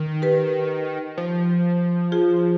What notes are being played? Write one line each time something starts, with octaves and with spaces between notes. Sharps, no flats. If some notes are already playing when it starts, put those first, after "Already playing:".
Already playing: D#3
G4 B4
F3
F4 G#4